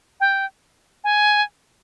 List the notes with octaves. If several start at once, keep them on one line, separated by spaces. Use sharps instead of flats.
G5
G#5